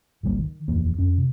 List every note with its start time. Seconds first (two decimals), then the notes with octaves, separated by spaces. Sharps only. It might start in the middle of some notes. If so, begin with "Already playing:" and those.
0.23 G#1 C#2 G3 A#3
0.39 D#3
0.68 D#1 F2 E3 A#3
0.98 F2 C#4
1.18 C3